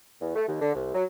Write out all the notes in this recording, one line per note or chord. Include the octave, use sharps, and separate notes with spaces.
E2
A3
D#2
D3
C2
F#3